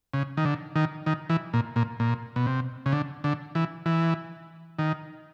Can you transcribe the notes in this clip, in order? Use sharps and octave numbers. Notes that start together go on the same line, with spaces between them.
C#3
D#3
D3
D#3
D#3
E3
A#2
A#2
A#2
B2
C3
C#3
D3
D3
E3
E3
D#3